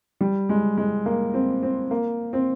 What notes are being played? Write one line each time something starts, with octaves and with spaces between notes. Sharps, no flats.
G3
G#3
G#3
A#3
C4
C4
A#3
C4